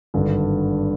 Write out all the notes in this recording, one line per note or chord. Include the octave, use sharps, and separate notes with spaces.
G#1 G2 D3